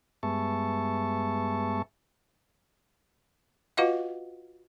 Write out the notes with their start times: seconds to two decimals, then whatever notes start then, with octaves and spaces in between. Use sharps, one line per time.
0.23 G2 G#3 B3 E5 A5 C#6
3.77 F4 F#4 B4 D#5 F5 F#5